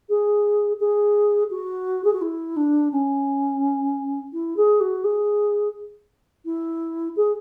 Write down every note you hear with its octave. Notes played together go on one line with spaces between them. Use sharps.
G#4
G#4
F#4
G#4
F#4
E4
D4
C#4
E4
G#4
F#4
G#4
E4
G#4